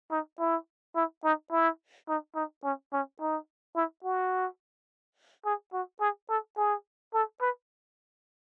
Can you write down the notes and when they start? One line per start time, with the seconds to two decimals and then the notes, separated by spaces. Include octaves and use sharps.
0.11 D#4
0.39 E4
0.95 E4
1.24 D#4
1.51 E4
2.08 D#4
2.35 D#4
2.64 C#4
2.93 C#4
3.20 D#4
3.76 E4
4.04 F#4
5.45 G#4
5.73 F#4
6.00 G#4
6.29 A4
6.57 G#4
7.14 A4
7.41 B4